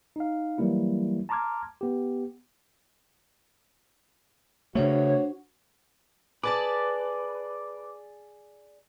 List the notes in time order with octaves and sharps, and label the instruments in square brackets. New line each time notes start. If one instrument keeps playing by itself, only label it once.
[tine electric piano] D#4 F5
E3 F#3 G3 A#3 E4
A5 A#5 C6 D6 F6 G#6
B3 G4
[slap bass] C#3 A3 [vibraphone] D4 C5 [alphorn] F#4 [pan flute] C#5
[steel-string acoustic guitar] G#4 D5 A5 [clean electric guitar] B4 [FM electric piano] D6